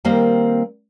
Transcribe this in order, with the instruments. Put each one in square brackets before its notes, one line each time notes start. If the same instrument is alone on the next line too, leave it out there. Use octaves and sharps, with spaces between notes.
[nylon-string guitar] D#3 G3 A#3 C4